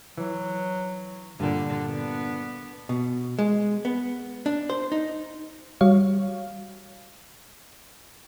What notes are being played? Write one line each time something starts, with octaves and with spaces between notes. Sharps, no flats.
E3 F#3
G2 A#2 D3 D4
B3
B2
G#3
B3
D4
C5
D#4
G3 F#4 C#5 F5